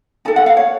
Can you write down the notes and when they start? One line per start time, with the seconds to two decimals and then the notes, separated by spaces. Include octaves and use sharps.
0.25 D#4 A4 A5
0.36 F#5
0.46 F5
0.57 C#5